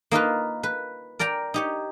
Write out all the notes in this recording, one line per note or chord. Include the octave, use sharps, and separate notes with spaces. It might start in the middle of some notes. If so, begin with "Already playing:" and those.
A#3 D#4 F4 B4
B4
A#4 D5 G5 A#5
D#4 G4 C#5